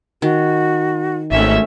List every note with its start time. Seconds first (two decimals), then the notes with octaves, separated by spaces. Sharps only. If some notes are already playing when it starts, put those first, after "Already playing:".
0.22 D#3 F#4
1.32 G#1 A3 C#4 E5